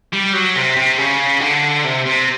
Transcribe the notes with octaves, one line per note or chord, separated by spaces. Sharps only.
G3
F#3
C3
C3
C#3
D3
C3
C3